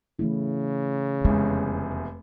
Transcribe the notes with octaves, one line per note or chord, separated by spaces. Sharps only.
C#3 E3 A3 E4
F1 E2 G#3